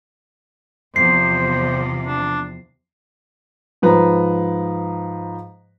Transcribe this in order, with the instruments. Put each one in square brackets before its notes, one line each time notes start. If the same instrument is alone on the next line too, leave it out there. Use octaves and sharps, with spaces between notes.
[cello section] E2 C3 F3 [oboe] C5 [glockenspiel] C7
[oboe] D4
[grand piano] G#2 F3 B4 A#5